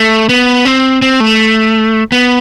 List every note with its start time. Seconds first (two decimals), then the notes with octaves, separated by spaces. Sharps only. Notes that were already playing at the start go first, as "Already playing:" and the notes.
Already playing: A3
0.29 B3
0.65 C4
1.02 C4
1.20 A3
2.12 B3